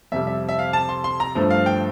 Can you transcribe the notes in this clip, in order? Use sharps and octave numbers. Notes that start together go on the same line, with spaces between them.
F2 C3 G3 E5
E5
E5
F5
A5
C6
C6
A#5
G2 F3 A3
F5
G5